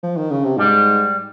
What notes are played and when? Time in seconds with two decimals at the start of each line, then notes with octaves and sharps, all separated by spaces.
0.03 F3
0.17 D#3
0.31 C#3
0.45 C3
0.57 G#2 G3